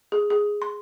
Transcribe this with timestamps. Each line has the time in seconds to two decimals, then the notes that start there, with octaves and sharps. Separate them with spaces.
0.12 G#4
0.30 G#4
0.62 C6